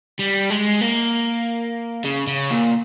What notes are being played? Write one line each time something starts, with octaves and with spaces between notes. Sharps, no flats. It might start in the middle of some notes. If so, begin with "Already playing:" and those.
G3
G#3
A#3
C#3
C#3
A#2